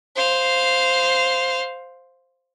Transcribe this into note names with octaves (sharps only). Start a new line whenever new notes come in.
C5 F5